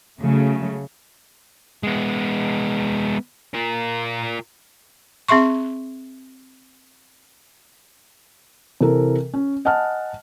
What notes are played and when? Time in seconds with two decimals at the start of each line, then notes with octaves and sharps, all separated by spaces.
0.20 C#3 F#3 A3
1.83 G#3 B3
3.54 F4 A#4
5.29 C4 G#4 E5 C6 C#6
8.81 C3 E3 A4 A#4
9.34 C#4
9.65 D#5 F#5 G#5 A5 F6